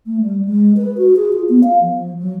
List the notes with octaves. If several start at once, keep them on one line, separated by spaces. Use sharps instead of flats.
A3
G3
G#3
B4
F#4
G#4
F4
B3
F5
F3
F#3